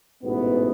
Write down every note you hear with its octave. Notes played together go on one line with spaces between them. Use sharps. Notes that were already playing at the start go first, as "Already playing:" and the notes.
A1 G#2 B2 E3 B3